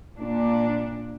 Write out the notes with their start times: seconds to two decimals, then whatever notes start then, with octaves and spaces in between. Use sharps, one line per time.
0.17 A#2 D4